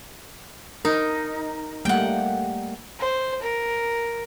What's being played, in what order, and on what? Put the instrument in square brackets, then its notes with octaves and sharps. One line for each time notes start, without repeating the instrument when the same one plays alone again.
[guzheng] D#4 [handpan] A#4
[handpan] G3 A3 A#3 [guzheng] F#5 G5
[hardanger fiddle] C5
A#4